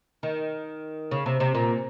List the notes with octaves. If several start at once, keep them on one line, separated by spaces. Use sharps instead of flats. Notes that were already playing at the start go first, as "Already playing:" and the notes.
D#3
C#3
C3
C3
A#2